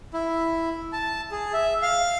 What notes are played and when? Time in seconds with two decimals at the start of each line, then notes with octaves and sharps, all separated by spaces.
0.13 E4
0.93 A5
1.31 G#4
1.53 E5
1.82 F5